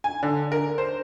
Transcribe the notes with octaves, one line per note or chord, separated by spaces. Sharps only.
G#5
D3
A#4
C5